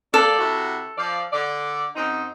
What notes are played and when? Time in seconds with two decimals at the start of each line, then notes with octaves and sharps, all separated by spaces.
0.14 F3 A#3 A4 D5
0.39 C3 E4 F#4
0.98 F3 D5
1.33 D3 D5
1.96 F#2 C4 D#4